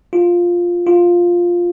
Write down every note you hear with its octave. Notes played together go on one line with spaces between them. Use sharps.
F4
F4